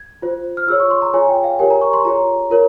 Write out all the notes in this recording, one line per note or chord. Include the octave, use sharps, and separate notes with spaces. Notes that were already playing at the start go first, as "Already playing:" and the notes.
Already playing: G#6
F4 C5
F6
F4 G#4 C#5 E6
C#6
C6
A#5
F4 G#4 C#5 G#5
G5
F5
G4 A#4 C#5 G#5
A#5
C#6
C6
F4 G#4 C#5 A#5
F4 A#4 C#5